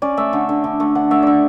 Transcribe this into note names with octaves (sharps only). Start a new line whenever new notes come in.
C#4 D5
A3 E5
D3
D3
D3
A3
D3 F#5
A3 E5
D4 D5 E5